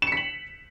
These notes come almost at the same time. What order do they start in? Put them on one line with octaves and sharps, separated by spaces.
E7 C#7 B6 F#7